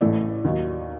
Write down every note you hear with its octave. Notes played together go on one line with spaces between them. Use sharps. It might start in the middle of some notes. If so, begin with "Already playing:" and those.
A1 A2 E3 A3 D5
D#2 D#3 F#3